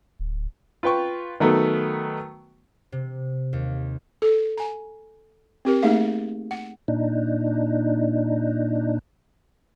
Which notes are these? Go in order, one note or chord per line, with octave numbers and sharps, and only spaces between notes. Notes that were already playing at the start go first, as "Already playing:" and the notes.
D1
F4 B4 G5 C#6
D#3 F#3 A3 B3
C3
D#2
A4
G#5 A#5
C4 G4 A#4
A3 A#3 D#4 G#4 E5 F5
F#5
A#2 D4 D#4